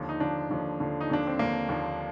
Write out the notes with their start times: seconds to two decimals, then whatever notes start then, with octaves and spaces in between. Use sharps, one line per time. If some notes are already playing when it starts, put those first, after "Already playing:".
Already playing: D#2 D3 F3
0.09 D#4
0.20 D#2 D3 F3 D4
0.50 D#2 D3 F3
0.80 D#2 D3 F3
1.01 D#4
1.09 D#2 D3 F3 D4
1.27 C4
1.39 D#2 D3 F3 A#3
1.68 D#2 D3 F3